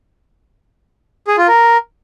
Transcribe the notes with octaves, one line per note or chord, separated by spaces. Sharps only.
G#4
F4
A#4